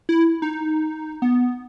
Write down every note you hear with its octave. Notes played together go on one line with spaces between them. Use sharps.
E4
D#4
B3